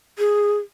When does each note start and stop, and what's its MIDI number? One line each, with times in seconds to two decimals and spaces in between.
0.19 0.58 68